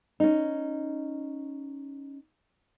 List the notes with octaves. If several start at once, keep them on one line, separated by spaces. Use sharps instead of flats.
C#4 D#4